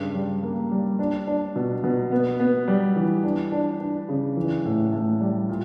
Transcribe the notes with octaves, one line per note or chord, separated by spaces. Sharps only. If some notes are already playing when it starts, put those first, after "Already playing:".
Already playing: G2 C#3
G3
A#3
G3
D4
D4
B2
B2
B3
B3
G3
E3
D4
D4
D4
C#3
E3
A2
A2
G3
A#2